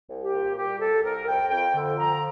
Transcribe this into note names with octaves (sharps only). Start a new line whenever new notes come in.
C2
G4
A#2
G3 G4
C2 A4
C2 A#4
F2 G5
F2 G5
D3
F3 A#5